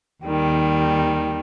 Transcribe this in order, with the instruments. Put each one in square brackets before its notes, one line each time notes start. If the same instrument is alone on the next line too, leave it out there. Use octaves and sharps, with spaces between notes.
[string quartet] D#2 D#3 G3